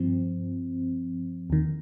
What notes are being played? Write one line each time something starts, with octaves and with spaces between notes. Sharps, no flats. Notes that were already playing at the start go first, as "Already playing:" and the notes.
Already playing: G2 F3 C4
D#2 D#3